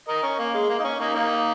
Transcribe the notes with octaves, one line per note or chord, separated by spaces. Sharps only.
A#4 D#5
C#4
A#3
G#3
A#3
D#4
C#4
A#3 D#4
A#3 D#4